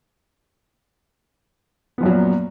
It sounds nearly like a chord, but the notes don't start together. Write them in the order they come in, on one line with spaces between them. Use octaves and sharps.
B3 F3 F#2 F#3 A#2